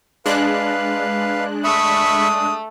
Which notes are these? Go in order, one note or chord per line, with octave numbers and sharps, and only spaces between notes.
G#3 D4 B4 F5 F#6
A3 E5 B5 C#6 D#6